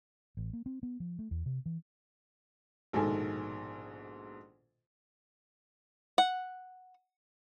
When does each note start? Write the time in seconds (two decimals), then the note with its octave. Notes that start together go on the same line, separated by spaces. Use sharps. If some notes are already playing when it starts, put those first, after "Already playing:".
0.37 A1
0.53 A#3
0.66 C4
0.83 B3
1.00 F3
1.19 A3
1.31 E2
1.46 C3
1.66 E3
2.93 A#1 G#2 B2 D#3 A4 G#5
6.18 F#5